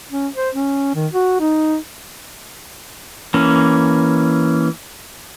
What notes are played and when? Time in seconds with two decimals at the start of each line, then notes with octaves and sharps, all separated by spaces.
0.11 C#4
0.36 C5
0.55 C#4
0.95 D#3
1.13 F#4
1.40 D#4
3.34 E3 A#3 C#4